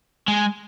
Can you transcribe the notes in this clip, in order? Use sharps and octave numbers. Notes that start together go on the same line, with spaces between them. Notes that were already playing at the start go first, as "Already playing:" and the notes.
G#3